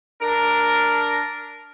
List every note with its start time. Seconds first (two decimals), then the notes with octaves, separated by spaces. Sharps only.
0.21 D4 A#4